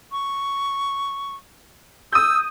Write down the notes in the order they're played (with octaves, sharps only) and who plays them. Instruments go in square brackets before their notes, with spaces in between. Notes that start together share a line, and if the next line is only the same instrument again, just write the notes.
[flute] C#6
[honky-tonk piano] D#6 G6 [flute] E6